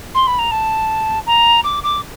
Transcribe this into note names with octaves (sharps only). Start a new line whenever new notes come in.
C6
B5
A#5
A5
A#5
D6
D6